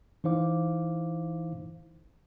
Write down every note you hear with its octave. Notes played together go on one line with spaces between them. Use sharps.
E3 D#4 E4 C5 F5 D6